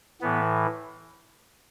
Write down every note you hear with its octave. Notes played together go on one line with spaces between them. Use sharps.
A2 E3 B3